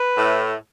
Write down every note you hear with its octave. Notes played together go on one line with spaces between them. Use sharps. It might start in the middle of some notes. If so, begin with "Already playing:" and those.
Already playing: B4
A2